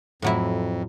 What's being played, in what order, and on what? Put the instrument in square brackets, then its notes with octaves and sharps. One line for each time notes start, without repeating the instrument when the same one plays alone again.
[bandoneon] F2 [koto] A2 F#3 E4